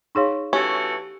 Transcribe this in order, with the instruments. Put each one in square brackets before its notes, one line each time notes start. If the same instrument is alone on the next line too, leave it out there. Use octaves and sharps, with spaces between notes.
[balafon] D#4 G#4 C#5 [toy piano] F5 C6 C#6
[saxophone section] E3 A3 F#4 [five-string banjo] C#4 [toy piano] G4